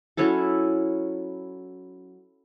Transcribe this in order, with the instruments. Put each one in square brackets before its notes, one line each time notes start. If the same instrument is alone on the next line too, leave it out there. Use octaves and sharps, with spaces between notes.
[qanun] F#3 C#4 E4 A4